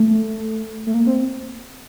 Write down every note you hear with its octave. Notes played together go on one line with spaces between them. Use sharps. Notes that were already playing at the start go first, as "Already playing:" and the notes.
Already playing: A3
A3
A#3
C4